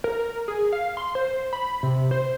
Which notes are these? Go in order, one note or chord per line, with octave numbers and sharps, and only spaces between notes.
A#4
G#4
F5
C6
C5
B5
C3
C5